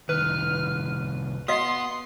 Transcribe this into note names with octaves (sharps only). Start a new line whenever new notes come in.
C2 D#3 B4 F6
B3 F#4 D#5 F5 C6 D#6